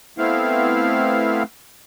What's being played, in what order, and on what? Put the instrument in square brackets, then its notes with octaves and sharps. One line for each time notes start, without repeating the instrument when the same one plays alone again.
[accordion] A3 B3 C4 E4 F5